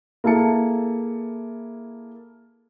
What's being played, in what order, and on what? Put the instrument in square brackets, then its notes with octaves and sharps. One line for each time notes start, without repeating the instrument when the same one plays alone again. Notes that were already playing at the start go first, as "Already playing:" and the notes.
[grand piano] A#3 E4 G#4 A4 A5 C#7